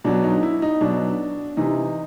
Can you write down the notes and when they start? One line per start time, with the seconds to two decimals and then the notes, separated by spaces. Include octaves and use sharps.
0.04 B2 F#3 D4
0.24 D#4
0.43 E4
0.62 D#4
0.81 B2 F#3 D4
1.57 C3 E3 D#4